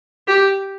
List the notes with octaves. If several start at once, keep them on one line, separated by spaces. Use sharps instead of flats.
G4